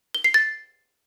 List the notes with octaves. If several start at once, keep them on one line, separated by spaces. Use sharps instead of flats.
G7
C7
A6